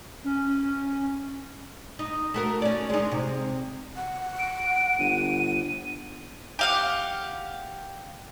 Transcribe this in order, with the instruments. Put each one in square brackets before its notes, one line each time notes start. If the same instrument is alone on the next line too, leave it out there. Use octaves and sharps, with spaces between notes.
[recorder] C#4
[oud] D#4
A3 F#4 A#4
C#4 D5
G#3 D#4
C3
[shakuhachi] F#5
[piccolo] D7
[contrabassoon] G1 [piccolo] D#7
[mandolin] G4 F5 F#5